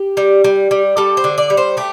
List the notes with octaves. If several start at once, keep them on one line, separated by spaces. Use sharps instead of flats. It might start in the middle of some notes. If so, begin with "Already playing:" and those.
Already playing: G4
G3
G3
G3
G3 A4
C5
D3
D5
G3
C5
A3 G4